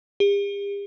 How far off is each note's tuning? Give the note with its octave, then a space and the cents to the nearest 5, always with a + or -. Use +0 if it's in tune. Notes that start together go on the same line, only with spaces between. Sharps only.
G4 +45